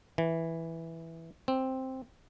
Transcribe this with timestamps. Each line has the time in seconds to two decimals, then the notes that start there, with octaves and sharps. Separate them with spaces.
0.18 E3
1.48 C4